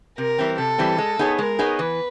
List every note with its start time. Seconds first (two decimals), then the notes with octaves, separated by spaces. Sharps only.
0.18 C3 A#4
0.39 E3 G3 C4
0.58 C3 A4
0.78 E3 G3 C4
0.98 G#3
1.19 B3 D#4 G#4 C#5
1.39 G#3 A#4
1.59 B3 D#4 G#4 C#5
1.79 E3 B4